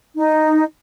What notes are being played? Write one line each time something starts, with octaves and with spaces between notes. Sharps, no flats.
D#4